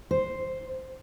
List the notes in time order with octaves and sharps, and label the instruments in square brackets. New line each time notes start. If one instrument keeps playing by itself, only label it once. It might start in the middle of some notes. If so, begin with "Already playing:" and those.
[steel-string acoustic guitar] C5